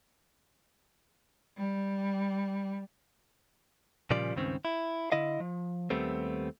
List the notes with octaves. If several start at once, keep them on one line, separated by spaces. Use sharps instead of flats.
G3
A#2 C#3 F3 G3 D5
C#2 G2 D#3 C4 C#4
E4
D3 E4 D#5 F5
F3
D#2 G3 A3 B3 C4